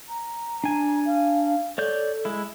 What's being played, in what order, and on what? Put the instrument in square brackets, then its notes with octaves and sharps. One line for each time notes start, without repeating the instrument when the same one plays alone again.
[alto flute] A#5
[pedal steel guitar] D4 G#5
[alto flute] F5
[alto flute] A4 [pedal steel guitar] C#5 D5 G6
[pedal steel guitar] G#3 E4